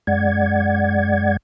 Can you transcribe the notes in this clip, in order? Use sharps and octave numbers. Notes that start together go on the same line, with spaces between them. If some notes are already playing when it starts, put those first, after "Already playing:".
F#2 G#3 D5 F#5 G#6